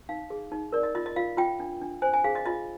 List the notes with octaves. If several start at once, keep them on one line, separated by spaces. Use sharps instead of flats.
D#4 F5
G#4
D#4
A#4 D5
D#5
F4 D#5
D#5
F4 F5
F4 G5
D4
D4
C5 G#5
G#5
G#4 F5
D#5
F4 D#5